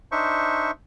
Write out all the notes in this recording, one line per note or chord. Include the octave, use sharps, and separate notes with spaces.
D4 D#4 C5 E5 C#6